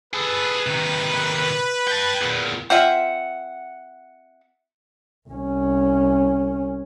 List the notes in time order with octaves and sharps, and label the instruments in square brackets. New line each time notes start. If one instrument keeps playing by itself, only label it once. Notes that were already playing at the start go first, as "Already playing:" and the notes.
[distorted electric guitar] G#4 A4 [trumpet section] B4
[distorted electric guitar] C3 D#3
G5 A5
E2 A#2
[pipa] C4 F4 E5 [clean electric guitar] F#5
[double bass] C2 C#4